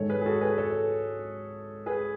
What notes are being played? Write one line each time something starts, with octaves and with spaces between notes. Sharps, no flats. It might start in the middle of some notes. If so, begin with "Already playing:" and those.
Already playing: G#2 D#3 G#3 A4 C#5
G#4 B4
G#4
F#4 A4
G#4 B4
A4 C#5
G#4 B4